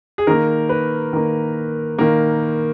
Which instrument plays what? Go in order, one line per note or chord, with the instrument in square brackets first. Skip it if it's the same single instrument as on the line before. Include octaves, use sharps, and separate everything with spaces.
[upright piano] G#4
D#3 A#3 A#4
B4
D#3 A#3
D#3 A#3